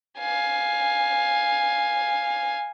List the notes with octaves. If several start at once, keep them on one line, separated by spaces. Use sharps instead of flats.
F5 G#5